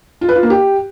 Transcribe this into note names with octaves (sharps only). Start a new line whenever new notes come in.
F4
B4
F4
A#3
G4